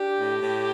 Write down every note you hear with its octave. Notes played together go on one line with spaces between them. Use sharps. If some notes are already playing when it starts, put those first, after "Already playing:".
Already playing: D4 G4
A2
A2